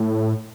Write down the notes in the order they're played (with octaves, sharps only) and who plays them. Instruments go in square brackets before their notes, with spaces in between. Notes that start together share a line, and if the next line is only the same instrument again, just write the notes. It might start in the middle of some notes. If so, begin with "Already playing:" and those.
Already playing: [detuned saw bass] A2